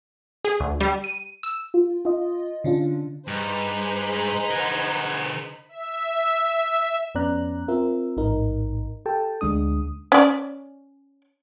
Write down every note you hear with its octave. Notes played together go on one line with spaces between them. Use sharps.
G#4
D2
G3
D#7
E6
F4
F4 D#5
D3 C#4 D4 F4
G2 D#4 G#4 B4 C5 B5
G#3
D3 A#4 F#5 G#5
E5
F2 B3 C#4 D5 A#5 F#6
C4 F4 A#4 E5
A1 G#2 D#4 A#4
G4 A4 G5 A5
D2 G#3 D4 D#6
C#4 D5